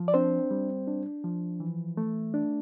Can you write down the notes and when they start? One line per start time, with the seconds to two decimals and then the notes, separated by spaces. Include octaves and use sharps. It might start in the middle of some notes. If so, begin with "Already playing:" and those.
Already playing: F3
0.08 D5
0.14 C4 D4 C5
0.51 G3
0.87 D4
1.24 F3
1.60 E3
1.97 A3
2.34 D4